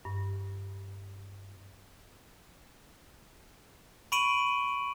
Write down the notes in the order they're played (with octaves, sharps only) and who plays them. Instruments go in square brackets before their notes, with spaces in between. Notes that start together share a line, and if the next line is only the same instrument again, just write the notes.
[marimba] G2
[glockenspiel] B5 C#6 D7 D#7 F#7